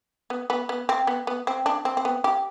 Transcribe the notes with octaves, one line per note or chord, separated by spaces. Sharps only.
B3
B3
B3
C4
B3
B3
C4
D4
C4
C4
B3
G4